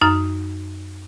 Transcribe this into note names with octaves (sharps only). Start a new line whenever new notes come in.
F#2 D#4 F6